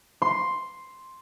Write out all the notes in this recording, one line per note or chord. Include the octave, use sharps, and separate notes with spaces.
C6